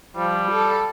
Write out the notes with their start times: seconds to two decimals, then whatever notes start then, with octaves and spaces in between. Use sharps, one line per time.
0.16 F3 G3
0.52 A4